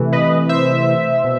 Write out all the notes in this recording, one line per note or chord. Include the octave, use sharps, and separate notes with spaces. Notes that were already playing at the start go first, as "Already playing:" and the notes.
Already playing: C3 E3 A3
B4 D#5
C5 E5
B2